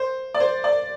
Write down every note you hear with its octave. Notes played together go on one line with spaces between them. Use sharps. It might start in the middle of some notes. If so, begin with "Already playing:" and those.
Already playing: C5
D5
C5
D5